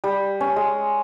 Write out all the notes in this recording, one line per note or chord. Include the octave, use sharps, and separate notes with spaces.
G3
C#4
G#3